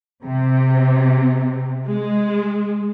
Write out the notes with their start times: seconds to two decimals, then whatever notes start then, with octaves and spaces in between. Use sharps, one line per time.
0.24 C3
1.87 G#3